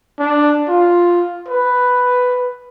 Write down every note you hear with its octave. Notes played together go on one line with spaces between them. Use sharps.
D4
F4
B4